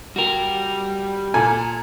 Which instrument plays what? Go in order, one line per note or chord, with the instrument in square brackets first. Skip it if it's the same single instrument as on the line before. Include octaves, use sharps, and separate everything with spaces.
[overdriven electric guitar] G3 G5 [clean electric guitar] F#4 A#4
[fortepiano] A#2 A4 G#5 [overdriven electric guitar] A#5 C6